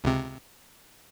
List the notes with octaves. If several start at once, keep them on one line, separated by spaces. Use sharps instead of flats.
C#2 C3